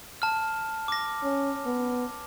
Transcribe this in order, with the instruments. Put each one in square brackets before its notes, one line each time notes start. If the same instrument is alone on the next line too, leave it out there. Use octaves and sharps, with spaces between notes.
[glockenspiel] A5 F6
D6 A#6
[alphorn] C#4
B3